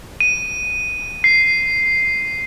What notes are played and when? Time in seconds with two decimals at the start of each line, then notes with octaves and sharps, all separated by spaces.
0.20 D#7
1.24 C7